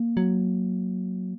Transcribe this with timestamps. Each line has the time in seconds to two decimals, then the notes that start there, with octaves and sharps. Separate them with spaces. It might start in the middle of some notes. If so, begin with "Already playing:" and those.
Already playing: A#3
0.17 F#3